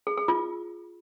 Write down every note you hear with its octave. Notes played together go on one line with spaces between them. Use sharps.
G#4
G#4
F4